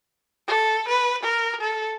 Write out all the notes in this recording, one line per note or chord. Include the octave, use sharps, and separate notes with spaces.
A4
B4
A#4
A4